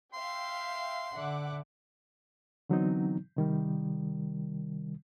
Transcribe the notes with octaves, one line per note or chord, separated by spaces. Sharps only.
E5 F5 G5 C6
D3 E5 F#5 D6
D3 E3 F#3 B3 C4 D#4
C3 D#3 G3